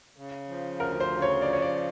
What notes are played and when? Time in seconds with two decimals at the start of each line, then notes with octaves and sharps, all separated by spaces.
0.16 C#3
0.49 F3
0.80 D2 A#4
1.00 C5
1.11 C#3
1.22 C#5
1.42 F3 D5
1.53 C#5
1.62 D5